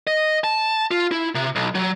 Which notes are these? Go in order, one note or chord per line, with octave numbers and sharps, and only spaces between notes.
D#5
A5
F4
E4
C3
B1
F#3